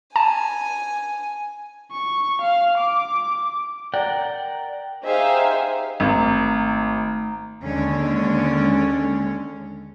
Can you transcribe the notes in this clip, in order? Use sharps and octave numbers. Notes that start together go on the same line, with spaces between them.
G#5 A5
C#6
F5
D6
A#4 D5 F#5 G5
D#4 G4 G#4 C5 E5 F5
G#1 A3 A#5
D#2 D3 G#3 C#4